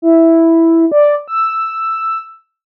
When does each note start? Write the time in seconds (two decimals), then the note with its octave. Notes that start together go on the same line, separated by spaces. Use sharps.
0.02 E4
0.92 D5
1.28 E6